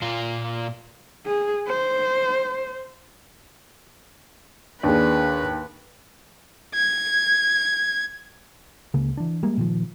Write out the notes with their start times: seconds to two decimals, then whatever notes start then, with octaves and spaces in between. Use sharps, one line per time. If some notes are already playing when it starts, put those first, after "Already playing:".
0.02 A#2 F4
1.26 G#4
1.67 C5
4.83 D#2 D4 G#4 B4
6.74 G#6
8.94 C#2 C#3 A#3
9.17 E3 D4
9.43 G3 G#3 A#3
9.57 A#2 D#3 F3